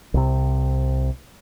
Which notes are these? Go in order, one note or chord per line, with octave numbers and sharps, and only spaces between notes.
C2 C3